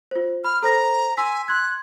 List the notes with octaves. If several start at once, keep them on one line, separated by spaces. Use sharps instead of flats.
F4 C5
B5 F6
A4 C5 A#5 A#6
G#5 C6 E6 B6
C6 F#6 G#6